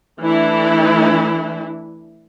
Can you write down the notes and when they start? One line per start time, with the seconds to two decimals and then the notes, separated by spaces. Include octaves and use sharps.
0.20 E3 A3 D4 E4